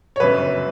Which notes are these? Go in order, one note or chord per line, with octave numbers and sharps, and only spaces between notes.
C#5
G1 F#2 C#3 B4